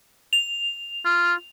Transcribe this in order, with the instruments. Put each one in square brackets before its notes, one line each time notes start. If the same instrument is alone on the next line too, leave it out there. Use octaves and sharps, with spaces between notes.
[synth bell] F7
[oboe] F4